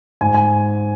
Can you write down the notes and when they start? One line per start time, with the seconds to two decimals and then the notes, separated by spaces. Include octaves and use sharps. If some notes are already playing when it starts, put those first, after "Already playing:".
0.21 G#2 G#5
0.34 G#5